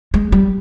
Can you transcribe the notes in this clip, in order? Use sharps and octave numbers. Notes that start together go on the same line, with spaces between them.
G#3
G3